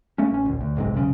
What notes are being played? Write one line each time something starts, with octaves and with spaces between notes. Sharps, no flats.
A3 A#3 C#4
A1 C#4
A#1 D#2
D2
F#1 B1 G#2 C3
C2 F#2 C#3